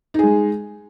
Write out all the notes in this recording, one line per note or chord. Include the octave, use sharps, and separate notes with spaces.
G#3 D#4 G#4